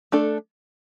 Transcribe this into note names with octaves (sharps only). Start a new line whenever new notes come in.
A3 D4 A4